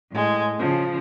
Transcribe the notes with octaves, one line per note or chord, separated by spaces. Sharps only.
A2 G#3
C#3 F3